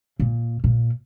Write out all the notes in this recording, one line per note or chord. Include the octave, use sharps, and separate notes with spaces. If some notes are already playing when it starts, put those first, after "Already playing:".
A#2
A#2